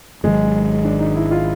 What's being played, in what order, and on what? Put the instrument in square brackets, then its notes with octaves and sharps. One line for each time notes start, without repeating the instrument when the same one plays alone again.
[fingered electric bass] G#1 G#2 D#3 F#3 [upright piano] G#3
[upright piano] D4
D#4
E4
F4